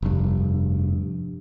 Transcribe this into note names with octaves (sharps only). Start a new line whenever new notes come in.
F1 G2